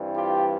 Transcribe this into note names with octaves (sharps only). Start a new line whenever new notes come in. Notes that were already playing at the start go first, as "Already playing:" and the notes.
Already playing: G2 E3 G3 C4
F4 G4